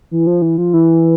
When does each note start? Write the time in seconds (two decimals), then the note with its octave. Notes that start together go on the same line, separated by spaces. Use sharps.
0.11 E3
0.27 F3
0.42 E3
0.58 F3
0.73 E3